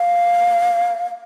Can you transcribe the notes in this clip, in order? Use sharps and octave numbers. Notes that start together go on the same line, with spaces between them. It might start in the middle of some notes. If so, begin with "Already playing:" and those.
Already playing: F5